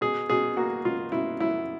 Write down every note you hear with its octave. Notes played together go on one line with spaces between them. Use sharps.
B2 G#4
B2 G#4
A#3 F#4
B2 F4
B2 E4
F#3 E4